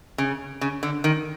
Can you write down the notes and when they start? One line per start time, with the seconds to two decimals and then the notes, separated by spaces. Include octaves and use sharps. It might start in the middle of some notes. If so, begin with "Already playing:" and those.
0.18 C#3
0.61 C#3
0.83 D3
1.04 D#3